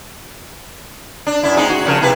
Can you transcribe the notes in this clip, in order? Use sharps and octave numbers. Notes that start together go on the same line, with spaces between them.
D4
F#2 E4
G#3 C4 D#4
F#4
C#3 F3 A#4
C3 E4 B4